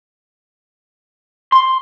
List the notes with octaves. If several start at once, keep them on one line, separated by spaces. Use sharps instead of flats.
C6